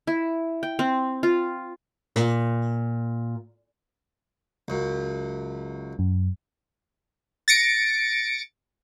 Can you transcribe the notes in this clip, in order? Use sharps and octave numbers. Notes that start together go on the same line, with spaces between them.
E4
G5
C4
F4
A#2
C#2 F#2
F#2
A6 A#6 C#7 D7